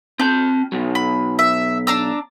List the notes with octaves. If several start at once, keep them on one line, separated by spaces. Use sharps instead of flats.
C4 A5 G6
B2 F#3
B5
E5
D4 A#5 E6